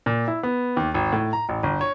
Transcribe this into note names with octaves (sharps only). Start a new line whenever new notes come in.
A#2
E4
B3
D#2
G#1
A2
A#5
A1
G1
C#5